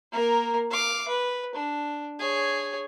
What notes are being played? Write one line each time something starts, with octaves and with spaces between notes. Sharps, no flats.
A#3 A#4
F5 D6
B4
D4
G#4 C#5